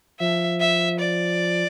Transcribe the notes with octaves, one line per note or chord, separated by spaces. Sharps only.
F3 E5
E5
D5